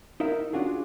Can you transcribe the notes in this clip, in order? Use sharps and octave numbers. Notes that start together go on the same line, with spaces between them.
D#4 E4 A#4 E5 F5
C#4 D4 F4 F#4 G#4